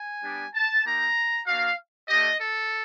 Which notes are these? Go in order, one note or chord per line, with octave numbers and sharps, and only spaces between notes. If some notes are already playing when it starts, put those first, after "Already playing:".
Already playing: G#5
G3 B3 D4 G4
A5
A#3 D#4 G4 A#5
A#3 D4 F#4 F5
A3 D4 G4 D#5
A4